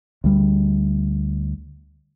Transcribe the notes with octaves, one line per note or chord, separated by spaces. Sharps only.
D2 G3